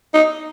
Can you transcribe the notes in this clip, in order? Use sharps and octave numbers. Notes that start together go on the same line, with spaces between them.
D#4